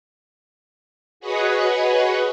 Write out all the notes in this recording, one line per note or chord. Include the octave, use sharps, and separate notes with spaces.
F#4 G#4 B4 C#5 D#5 F#5